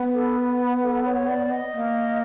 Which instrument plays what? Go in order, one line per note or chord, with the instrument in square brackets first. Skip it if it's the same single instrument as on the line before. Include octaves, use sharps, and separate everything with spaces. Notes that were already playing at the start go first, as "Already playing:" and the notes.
Already playing: [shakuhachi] B3
[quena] A4
B4
A4
C#5
D5
D#5
[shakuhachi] A#3